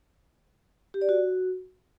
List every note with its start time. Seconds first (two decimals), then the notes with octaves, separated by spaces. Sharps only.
0.94 G4
1.01 D5
1.09 F#4